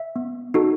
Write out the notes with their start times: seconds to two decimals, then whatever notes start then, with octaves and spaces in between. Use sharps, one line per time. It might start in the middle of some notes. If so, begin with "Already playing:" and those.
Already playing: E5
0.16 B3
0.54 D#4 F#4 A4